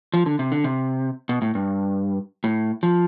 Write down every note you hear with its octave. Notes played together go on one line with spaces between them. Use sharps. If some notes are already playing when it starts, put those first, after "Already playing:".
F3
D3
C3
D3
C3
B2
A2
G2
A2
F3